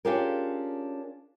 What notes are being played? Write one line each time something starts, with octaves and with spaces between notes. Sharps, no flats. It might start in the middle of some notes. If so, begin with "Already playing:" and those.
C#4 D4 F4 G4 G#4 A#4